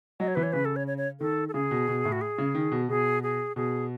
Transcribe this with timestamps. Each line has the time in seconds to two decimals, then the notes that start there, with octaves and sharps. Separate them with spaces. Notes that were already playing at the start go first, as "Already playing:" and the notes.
0.20 F#3 D#5
0.28 C#5
0.35 E3 B4
0.43 C#5
0.53 C#3 B4
0.65 A4
0.76 C#5
0.87 C#5
0.98 C#5
1.20 D#3 A4
1.48 A4
1.54 C#3 G#4
1.71 B2
1.88 B2
2.05 A2
2.12 F#4
2.21 G#4
2.38 C#3
2.55 D#3
2.72 B2
2.89 B2 G#4
3.23 G#4
3.56 B2 G#4